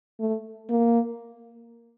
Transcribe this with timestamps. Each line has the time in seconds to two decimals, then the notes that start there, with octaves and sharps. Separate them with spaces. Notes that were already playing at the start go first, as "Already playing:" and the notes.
0.20 A3
0.69 A#3